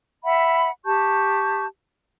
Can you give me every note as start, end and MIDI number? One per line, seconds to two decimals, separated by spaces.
0.24 0.70 76
0.24 0.70 78
0.24 0.70 83
0.85 1.66 67
0.85 1.66 81
0.85 1.66 85
0.85 1.66 91